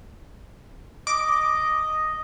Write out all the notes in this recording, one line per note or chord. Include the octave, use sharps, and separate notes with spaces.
D#5 D6